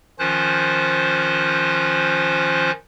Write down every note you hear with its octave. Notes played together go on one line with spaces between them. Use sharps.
D#3 F3 C#4 F4 C5 F#6